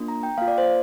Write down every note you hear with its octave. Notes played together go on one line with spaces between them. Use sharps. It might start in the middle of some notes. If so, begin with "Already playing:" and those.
Already playing: A#3 D4 F4
A#5
G5
A#3 F4 F5
D5
C5